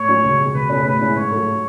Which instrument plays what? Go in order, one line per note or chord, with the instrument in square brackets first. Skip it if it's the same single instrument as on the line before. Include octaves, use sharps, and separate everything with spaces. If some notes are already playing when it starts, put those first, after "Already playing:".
Already playing: [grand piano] A2 [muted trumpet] C#5
[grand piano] F#3 C#4
C#2
B2 G#3
[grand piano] C#2 [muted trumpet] B4
[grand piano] B2 A3 C#4 G#4
[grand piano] A2 [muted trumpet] B4
[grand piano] G#3 C#4 E4 G#4
[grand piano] G#2 [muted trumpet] C#5
[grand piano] F#3 A3